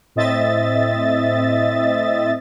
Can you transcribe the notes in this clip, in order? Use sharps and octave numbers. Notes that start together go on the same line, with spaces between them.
A2 C4 D#5 E5 A6